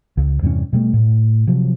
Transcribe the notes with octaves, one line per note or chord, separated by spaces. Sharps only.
C#2
E2 G2 C3 C#4
B2 G3 A3
A2
C3 F3 F#3